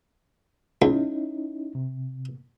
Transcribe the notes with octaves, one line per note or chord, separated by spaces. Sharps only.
C#2 C#4 D#4 E4
C3